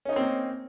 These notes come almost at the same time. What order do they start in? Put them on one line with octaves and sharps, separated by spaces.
C#4 D#4 C#5 C4 A#3